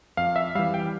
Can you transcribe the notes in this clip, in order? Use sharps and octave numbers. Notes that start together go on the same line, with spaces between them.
F2 F5
E5
E3 G3 F5
G5